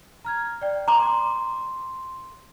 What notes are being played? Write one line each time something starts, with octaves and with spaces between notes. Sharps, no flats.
A#5 F6 G#6
D5 G5
A#5 C6 D6